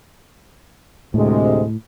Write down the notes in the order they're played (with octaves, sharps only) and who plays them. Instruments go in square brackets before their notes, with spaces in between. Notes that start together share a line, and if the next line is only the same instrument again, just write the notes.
[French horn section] D2 C3 G#3 [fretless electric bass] A2